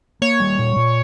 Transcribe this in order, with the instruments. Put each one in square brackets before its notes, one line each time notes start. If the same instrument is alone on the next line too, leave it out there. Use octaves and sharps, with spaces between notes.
[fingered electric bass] A#3 [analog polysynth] C#5
[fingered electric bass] G3
A#2
A#2